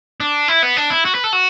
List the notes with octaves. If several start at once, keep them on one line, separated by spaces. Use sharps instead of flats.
D4
E4
B3
D4
E4
F#4
B4
A4
F#4